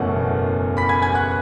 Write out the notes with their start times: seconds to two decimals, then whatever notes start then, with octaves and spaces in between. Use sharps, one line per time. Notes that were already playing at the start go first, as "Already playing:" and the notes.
Already playing: F#1 E2 B2 A3 C#4 F#5
0.77 B5 B6
0.89 G#5 G#6
1.02 G#5 G#6
1.15 F#5 F#6